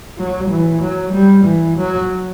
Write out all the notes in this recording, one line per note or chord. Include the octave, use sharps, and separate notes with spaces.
F#3
E3
F#3
G3
E3
F#3